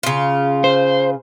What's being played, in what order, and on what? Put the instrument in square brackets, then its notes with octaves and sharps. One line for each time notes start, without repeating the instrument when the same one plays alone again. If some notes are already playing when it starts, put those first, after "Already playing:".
[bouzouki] C#3 F4
[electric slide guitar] C5